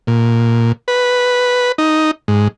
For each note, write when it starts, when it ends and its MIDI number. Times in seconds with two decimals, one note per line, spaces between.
0.07 0.72 46
0.88 1.72 71
1.78 2.11 63
2.28 2.48 44